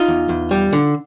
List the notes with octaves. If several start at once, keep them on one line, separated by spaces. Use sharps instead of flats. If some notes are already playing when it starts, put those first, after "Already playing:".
Already playing: D#4 F4
E2
E2
G3
D3